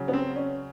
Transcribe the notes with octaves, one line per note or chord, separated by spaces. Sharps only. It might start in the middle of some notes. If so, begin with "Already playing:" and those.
Already playing: C#3 F#3
B3
C4
C#4